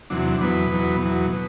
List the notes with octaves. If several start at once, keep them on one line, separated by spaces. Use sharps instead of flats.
E2 C3 F#3 D4
E2 B2 F#3 B3
E2 B2 F#3
E2 B2 F#3
B2